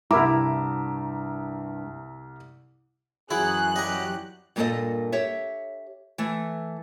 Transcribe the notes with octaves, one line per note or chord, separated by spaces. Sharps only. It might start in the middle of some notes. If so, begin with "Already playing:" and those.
C2 G2 E4 A#4 A#5 D6
F#2 E3 F#3 E4 G#4 F#6
F#3 G3 G4 D#5 G#5 A#5
G2 A#2 A#3 C#4 A4 D#5
G4 C#5 E5
E3 A3